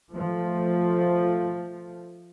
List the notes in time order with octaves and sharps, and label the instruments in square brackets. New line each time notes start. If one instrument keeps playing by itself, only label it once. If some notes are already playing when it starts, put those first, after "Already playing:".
[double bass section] F3 A3